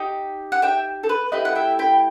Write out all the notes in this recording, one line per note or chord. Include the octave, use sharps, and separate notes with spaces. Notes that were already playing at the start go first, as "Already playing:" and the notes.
Already playing: D#4 G4
F#5
E5 G5
A4
B4
A3 E4 G4 B4 D#5
F#5
E5 G5
G5 B5